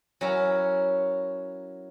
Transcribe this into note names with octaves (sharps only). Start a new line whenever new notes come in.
F#3 C#4 E4 A#4